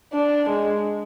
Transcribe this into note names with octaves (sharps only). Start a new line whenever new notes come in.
D4
G#3